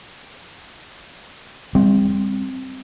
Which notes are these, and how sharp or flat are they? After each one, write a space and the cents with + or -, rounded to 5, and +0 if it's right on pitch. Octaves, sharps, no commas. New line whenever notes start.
G3 +35 C4 +0